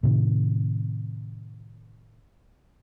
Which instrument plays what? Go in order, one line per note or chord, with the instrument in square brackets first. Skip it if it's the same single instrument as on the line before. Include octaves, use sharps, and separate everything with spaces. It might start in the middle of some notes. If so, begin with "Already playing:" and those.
[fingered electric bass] A2 C3 D#3